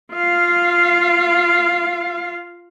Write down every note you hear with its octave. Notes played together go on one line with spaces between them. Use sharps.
F4 F5